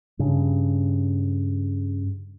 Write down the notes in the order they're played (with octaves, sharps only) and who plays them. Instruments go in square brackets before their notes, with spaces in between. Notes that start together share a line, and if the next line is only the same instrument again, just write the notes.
[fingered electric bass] G2 C#3